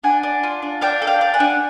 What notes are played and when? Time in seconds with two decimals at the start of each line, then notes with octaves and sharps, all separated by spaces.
0.04 D4 F#5 G#5
0.23 D4
0.43 F4
0.62 D4
0.81 D4 F5 G5
1.02 A4
1.07 F5 G5
1.21 D4
1.34 F#5 G#5
1.40 D4